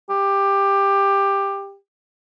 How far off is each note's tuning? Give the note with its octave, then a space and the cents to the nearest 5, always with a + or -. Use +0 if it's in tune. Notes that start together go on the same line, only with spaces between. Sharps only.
G4 +15